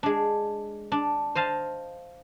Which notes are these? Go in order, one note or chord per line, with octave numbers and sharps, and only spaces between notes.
G#3 D4
D4
C5 D#5 F5 A5